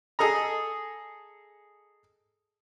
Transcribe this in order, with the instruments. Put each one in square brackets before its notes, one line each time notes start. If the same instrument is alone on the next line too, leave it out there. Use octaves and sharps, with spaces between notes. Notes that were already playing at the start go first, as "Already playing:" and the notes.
[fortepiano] G#4 A4 D#5 A#5